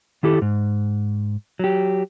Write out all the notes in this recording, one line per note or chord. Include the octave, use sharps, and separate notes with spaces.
D#3 E4 G4 A4
G#2
F#3 G4